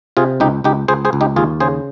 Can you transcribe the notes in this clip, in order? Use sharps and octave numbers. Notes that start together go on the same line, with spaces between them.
C3 F4 G#4
C#2 D#4 G4
C#2 D#4 G4
C#2 G#4 C5
G#4 C5
C#2
D#4 G4
D#2 F4 G#4
C#3 G#4 C5